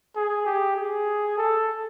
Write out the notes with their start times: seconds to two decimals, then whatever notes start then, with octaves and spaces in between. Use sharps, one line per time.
0.16 G#4
0.46 G4
0.76 G#4
1.38 A4